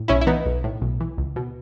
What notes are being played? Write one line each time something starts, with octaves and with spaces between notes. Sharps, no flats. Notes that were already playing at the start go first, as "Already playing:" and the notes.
Already playing: A2
B1 C#4 E4
E4
E3 B3 D#4
B1
A2
B1
E3
C#2
B2